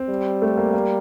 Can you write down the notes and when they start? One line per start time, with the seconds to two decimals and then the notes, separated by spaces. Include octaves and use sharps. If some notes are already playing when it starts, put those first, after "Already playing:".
Already playing: C4
0.09 G3
0.42 A3
0.57 A#3
0.73 A#3